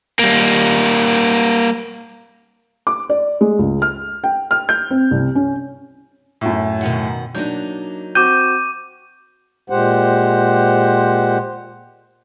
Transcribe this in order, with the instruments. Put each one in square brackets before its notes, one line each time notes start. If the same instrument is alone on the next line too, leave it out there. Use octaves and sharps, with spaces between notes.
[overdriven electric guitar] G3 A#3
[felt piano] D6
D5
G#3
C#2
F6
G5
F6
G6
C4
C2
C#4
[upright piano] F#2 A2
[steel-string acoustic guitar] B2 D#3 F#5
[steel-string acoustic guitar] F#3 A#3 D#4 [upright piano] D4 G6
[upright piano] C4 F#4 [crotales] D6 D#7 [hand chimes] G6
[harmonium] A#2 G#3 G4 C5 F#5